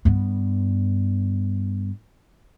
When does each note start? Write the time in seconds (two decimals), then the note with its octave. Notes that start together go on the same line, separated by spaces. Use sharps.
0.05 G2 B3